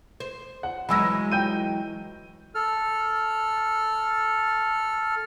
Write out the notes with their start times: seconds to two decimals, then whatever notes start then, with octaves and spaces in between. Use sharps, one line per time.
0.20 C5
0.63 F#5
0.89 E3 F#3 G#3 B5 E6 A#6
1.31 G5 G6 D#7
2.55 A4 F6